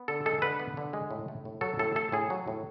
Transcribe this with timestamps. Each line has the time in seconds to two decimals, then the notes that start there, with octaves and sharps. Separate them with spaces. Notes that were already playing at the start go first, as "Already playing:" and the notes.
Already playing: B3
0.08 D3 A4
0.26 G#3 A4
0.42 D3 B4
0.59 B3
0.77 D3
0.93 G#3
1.11 A2
1.28 A3
1.45 A2
1.61 F#3 A4
1.79 A2 A4
1.96 A3 A4
2.12 A2 G#4
2.30 F#3
2.47 A2